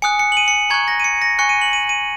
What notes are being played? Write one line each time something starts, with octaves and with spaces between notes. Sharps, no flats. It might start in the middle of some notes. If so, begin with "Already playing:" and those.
G#5 D#6 F#6 C#7
C#7
F#7
D#7
C#7
A#5 C#6 F#6 G#6
A#6
D#7
C#7
A#6
G#5 C#6 F#6 C#7
D#7
F#7
D#7
D#7